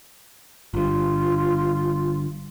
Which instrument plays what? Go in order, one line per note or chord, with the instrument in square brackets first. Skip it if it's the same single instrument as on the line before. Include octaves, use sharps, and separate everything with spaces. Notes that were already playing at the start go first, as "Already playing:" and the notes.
[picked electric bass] G1 G2 [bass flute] F4